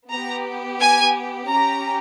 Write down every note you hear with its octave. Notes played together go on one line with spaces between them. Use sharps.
B3 G4 A#5
G#5
C#4 G4 A#5